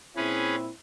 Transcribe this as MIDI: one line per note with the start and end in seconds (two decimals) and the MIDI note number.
0.17 0.70 46
0.17 0.70 60
0.17 0.56 61
0.17 0.70 64
0.17 0.56 68
0.17 0.56 71